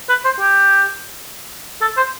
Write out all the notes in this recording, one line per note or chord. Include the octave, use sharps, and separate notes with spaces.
B4
C5
G4
A4
C5